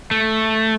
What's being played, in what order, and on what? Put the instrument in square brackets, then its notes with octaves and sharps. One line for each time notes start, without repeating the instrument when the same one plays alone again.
[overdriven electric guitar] A3